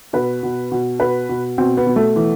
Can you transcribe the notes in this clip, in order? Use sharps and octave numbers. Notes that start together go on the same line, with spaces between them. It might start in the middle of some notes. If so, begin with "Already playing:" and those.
B2 B4
B2
B2
B2 B4
B2
B2 C4
B3
B2
A3
E3